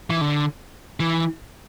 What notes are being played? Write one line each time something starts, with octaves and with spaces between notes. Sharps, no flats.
E3
D3
E3